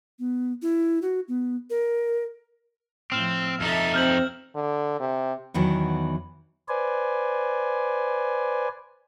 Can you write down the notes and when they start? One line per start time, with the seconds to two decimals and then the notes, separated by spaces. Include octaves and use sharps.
0.19 B3
0.62 E4
1.02 F#4
1.28 B3
1.70 A#4
3.12 A2 F3 C4 E6 F6 E7
3.60 F2 D#4 A4 E5
3.94 C4 F6 G6 F#7
4.55 D3
5.00 C3
5.54 E2 D#3 E3 F#3 B3
6.69 B4 C5 D5 G#5